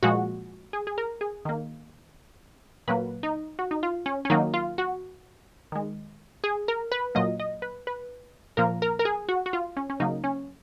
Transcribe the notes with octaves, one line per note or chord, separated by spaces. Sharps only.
A#2 F3 G#3 F#4
G#4
G#4
A#4
G#4
D#3 A#3
A#2 F#3 A#3 B4
D#4
F#4
D#4
F4
C#4
C#4
D#3 F#3 A#3 D#4
F4
F#4
D#3 G#3
G#4
A#4
B4
A#2 F#3 A#3 D#5
D#5
B4
B4
A#2 F3 A#3 A#4
A#4
A#4
G#4
F#4
F#4
F4
C#4
C#4
C#3 F#3 A#3 D#4
C#4